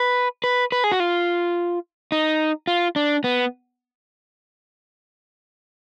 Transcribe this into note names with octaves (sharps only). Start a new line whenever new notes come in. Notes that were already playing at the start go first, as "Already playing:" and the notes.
Already playing: B4
B4
B4
G#4
F#4
F4
D#4
F4
D4
B3